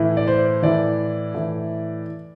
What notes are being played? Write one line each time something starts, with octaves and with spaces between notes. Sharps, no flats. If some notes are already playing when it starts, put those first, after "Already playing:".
Already playing: A2 E3
D5
C5
A2 E3 D5
A2 E3